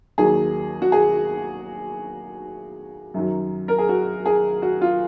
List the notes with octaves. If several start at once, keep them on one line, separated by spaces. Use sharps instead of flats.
D#2 D#3 F#3 G#4
F#4
G#4
F#2 D#3 F#3
A#4
G#4
F#4
G#4
F#4
F4